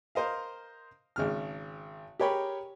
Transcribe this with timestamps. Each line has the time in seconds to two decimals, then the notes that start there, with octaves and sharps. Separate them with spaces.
0.15 A#4 C5 D#5 F5
1.16 G#1 C#3 F6
2.19 G4 G#4 A#4 C#5 G5 B5